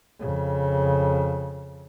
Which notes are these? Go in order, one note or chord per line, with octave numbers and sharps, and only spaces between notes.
F2 C#3